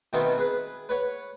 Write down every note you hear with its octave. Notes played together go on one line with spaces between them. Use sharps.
B2 D#3 A3 B3 C4
G#4 B4
B4 C#5 F#5